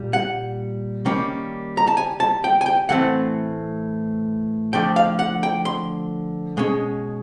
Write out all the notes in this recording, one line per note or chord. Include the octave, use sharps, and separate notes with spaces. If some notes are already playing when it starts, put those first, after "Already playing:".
Already playing: A#2 G3
F#5
D#3 G3 A#3 C#4
A#5
A5
G#5
A5
G5
G#5
G5
A2 E3 A3 C4 F#5
D3 F3 A3 G5
F5
F#5
G5
C6
B2 G#3 C#4